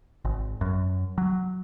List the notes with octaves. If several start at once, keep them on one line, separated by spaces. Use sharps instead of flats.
G#1
F#2
F#3